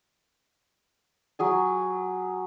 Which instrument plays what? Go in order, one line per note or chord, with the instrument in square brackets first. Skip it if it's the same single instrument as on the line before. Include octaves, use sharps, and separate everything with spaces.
[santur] F#3 G#4 G#5